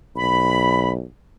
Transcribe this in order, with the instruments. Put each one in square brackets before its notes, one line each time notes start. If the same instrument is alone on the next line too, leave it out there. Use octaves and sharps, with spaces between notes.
[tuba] B1 [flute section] B5